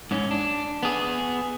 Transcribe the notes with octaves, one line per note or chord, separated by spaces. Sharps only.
G#2 C#4
D4
B3 G#4